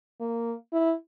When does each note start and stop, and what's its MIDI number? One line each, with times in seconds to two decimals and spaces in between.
0.20 0.54 58
0.73 0.93 64